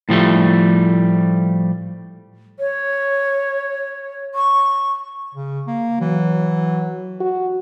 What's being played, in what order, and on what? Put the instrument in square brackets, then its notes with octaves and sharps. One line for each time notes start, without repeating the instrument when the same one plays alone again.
[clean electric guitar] A2 F3 G3 A3
[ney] C#5
C#6
[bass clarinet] C#3
A#3
[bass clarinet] E3 [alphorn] F#3
[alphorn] F#4